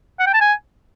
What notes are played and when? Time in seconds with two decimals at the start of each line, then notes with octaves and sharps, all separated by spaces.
0.19 F#5
0.27 G5
0.34 A5
0.41 G#5